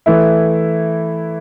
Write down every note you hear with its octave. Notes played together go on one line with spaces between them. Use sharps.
E3 A3 E4